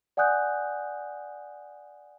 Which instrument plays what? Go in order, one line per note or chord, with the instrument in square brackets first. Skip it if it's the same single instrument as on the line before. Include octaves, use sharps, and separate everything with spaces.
[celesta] D5 F#5 G#5 D#6 F#6 G6